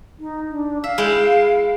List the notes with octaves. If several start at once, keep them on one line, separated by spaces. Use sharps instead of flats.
D#4
D4
E5 F5
G#3 E4 G5